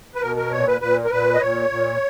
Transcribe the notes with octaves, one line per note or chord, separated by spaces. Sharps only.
B4
B2 A#4
A#4
A#2 C#5
B4
A#2 B4
A#4
A#2 B4
D#5
A#2 C#5
A#2